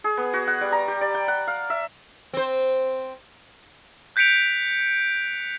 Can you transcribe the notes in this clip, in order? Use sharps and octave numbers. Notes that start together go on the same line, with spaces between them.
G#4
B3
F#4
F#5
G3
A#5
G4
D5
G5
F#5
F5
E5
C4 C5
F#6 G6 B6 C#7 D7 F7